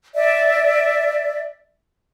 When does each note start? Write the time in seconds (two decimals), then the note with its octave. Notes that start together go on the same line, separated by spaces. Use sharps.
0.15 D5 E5